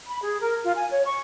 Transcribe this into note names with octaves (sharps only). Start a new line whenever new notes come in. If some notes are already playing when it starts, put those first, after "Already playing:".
B5
G#4
A#4
F4
G#5
C#5
C#6